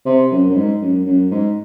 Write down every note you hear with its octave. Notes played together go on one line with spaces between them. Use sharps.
C3
F#2
F#2
G#2
F#2
F#2
G#2